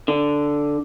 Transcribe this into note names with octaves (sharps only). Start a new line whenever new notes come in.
D3